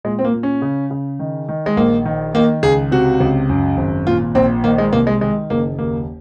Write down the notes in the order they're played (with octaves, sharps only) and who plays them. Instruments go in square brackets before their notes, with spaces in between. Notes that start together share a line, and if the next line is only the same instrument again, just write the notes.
[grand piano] A#2 G#3
C4
A#3
A#2
C#4
C#3
C#3
D#3
D#3
G#3
A#1 A#3
D#3
D#3 A#3
C#2 G#4
C3 F#4
C#2
F#2
G#1
A#2 F4
A#1 C4
D#3 A#3
G#3
C2 A#3
G#3
D#3 G#3
F#1 A#3
D#2 A#3